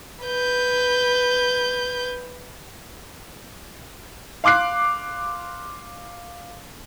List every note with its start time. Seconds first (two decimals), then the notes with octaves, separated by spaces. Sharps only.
0.25 B4 G6
4.44 F5 C6 D6 F#6 C7